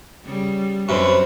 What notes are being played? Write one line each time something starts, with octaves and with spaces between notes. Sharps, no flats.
C#3 G3
F#2 C4 D4 B4 C5 C#6